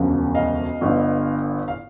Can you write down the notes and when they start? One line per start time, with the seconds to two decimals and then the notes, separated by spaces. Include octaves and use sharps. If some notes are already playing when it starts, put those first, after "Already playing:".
Already playing: E1 D2 C#3 F3
0.35 D#5 F5
0.81 G1 G2 D3
1.68 F5